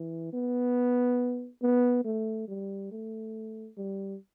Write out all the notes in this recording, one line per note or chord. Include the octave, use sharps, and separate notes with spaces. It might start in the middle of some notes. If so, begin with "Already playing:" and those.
Already playing: E3
B3
B3
A3
G3
A3
G3